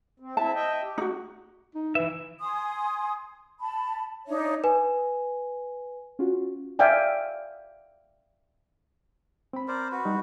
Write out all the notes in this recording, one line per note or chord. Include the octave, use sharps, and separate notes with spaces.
C4
C4 E4 E5 A5
D#5 E5 G5
G4
D#4 F#4
D#4
E3 B4 E5
G#5 C6 D#6
A5 B5
D4 D#4 C#5 E5
B4 G#5
C#4 F4 F#4
D5 E5 F5 G5 G#5
C4 B5
A#4 C5 D5
F#4 B4
G3 D#4